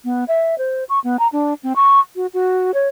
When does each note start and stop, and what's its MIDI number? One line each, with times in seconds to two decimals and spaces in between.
0.04 0.24 59
0.28 0.58 76
0.58 0.84 72
0.89 0.99 85
1.04 1.17 59
1.19 1.28 82
1.32 1.54 62
1.63 1.73 60
1.76 2.00 85
2.16 2.26 66
2.33 2.71 66
2.74 2.88 73